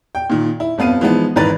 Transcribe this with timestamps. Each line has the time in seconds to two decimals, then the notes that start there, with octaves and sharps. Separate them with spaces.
0.15 G5
0.30 A#2 D#3
0.60 E4
0.78 G1 F2 B3 F5 D#7
1.01 E3 F3 G#3 B3 D#4
1.36 G#1 D#3 E3 B4 A#5 A6